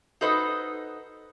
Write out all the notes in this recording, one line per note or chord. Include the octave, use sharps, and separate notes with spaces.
D#4 F#4 A4 B4 C5 D#5